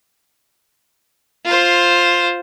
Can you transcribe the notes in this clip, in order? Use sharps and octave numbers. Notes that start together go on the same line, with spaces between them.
F4 C5